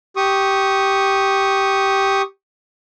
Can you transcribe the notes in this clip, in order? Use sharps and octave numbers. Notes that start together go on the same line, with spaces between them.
G4 C#6 D#6